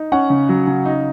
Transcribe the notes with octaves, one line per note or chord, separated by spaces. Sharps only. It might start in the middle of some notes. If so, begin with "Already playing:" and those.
Already playing: D#4
C#4 F#5
C#3
F#3
C#3
D#4